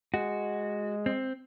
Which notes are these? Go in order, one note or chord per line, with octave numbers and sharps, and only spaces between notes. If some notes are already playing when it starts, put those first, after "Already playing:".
G#3 F#4
C4